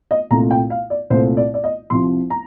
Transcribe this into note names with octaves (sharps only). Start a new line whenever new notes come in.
D#5
C2 A#2 A3 A#5
G5
F5
D5
C2 A#2 A3 C5
D5
D5
D#5
C2 C3 F3 C6
A#5